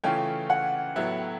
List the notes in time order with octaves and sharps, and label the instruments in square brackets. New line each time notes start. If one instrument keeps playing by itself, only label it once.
[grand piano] C#3 E3 A3 C#4 F4 [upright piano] G5
[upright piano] F#5
[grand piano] A2 F#3 B3 E4 G4